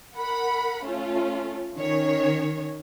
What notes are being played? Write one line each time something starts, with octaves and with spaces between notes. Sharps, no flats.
A#4 F#5 B5
A3 C#4 F4
D#3 C#4 C#5